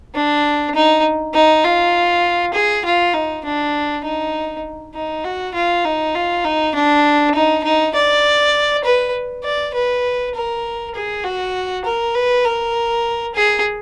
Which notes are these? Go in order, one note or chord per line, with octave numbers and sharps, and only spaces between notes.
D4
D#4
D#4
F4
G#4
F4
D#4
D4
D#4
D#4
F#4
F4
D#4
F4
D#4
D4
D#4
D#4
D5
B4
D5
B4
A#4
G#4
F#4
A#4
B4
A#4
G#4